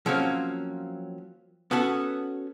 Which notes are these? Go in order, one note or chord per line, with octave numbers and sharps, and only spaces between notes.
F3 F#3 A#3 C4 C#4
B3 C#4 F#4 A4